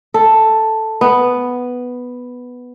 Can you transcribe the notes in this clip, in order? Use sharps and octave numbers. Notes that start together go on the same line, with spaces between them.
A4
B3